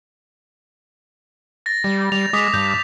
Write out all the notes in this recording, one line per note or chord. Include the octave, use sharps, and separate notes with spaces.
A6 A#6
G3
G3 F7
G#3 D6 D#6 B6
G2 G6